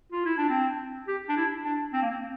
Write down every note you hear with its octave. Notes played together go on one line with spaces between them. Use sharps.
F4
E4
D4
C4
G4
D4
E4
D4
C4
A#3
C4